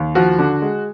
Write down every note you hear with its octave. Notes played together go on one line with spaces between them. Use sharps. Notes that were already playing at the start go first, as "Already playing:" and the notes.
Already playing: D#2
F3 F#4
D3
G#3